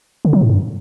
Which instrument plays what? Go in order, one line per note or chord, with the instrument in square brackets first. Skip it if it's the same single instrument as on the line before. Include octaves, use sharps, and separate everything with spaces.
[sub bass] D3
F#3
A2
G2